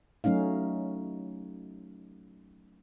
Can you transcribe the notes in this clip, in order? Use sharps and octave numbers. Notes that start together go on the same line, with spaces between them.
F#3 A3 C#4 D#4 F5